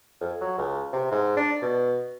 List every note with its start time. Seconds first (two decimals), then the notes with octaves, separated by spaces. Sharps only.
0.21 F2
0.41 F#3
0.58 C#2
0.93 C3
1.11 G#2
1.37 D4
1.62 B2